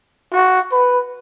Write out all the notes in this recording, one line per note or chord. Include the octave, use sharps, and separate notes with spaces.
F#4
B4